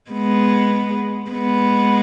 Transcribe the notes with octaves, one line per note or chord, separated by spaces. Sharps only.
G#3 B3
G#3 B3